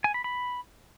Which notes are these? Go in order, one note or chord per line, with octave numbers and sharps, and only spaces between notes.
G#5
B5
B5